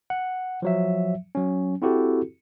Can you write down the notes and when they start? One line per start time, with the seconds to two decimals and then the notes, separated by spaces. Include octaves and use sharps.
0.10 F#5
0.62 F3 F#3 E5
1.35 F#3 C#4
1.82 C4 E4 F#4 G4 A4